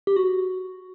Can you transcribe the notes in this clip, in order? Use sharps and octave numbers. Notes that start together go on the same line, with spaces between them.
G4
F#4